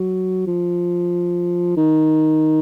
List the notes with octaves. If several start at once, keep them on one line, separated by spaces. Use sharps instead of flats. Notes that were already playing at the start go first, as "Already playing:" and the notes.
Already playing: F#3
F3
D#3